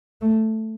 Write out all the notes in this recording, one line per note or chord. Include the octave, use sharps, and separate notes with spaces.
A3